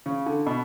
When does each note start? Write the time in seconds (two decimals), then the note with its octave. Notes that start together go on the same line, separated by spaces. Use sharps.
0.06 C#3
0.26 D3
0.46 B2